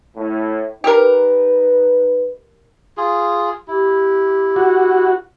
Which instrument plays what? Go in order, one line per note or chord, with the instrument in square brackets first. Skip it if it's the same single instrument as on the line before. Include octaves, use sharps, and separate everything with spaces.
[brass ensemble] A2
[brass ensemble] D#4 B4 [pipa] G4 A#4
[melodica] F4 G#4
[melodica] E4 [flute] G4
[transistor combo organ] F#4